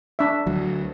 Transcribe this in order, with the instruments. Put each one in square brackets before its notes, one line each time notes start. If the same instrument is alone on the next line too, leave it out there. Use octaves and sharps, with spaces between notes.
[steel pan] D4 E5
[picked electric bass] D2 F#3